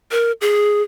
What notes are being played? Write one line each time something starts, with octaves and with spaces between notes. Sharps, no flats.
A#4
G#4